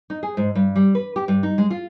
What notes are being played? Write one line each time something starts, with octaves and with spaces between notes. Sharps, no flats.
D#4
G#4
G#2
G2
G3
B4
G4
G2
D#4
G#3
F4